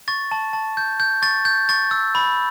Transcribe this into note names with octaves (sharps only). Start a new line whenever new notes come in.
C#6 A6
A5
A5
G6
G6
C#6 A6
G6
C#6 A6
E6
B5